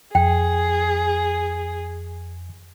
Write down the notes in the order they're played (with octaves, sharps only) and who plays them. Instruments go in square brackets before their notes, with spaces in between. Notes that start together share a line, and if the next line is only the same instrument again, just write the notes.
[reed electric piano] F2 [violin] G#4 [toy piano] G5